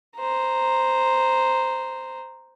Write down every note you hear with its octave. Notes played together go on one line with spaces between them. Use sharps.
C5 A#5